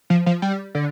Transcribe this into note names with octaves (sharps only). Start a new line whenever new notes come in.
F3
F3
G3
D3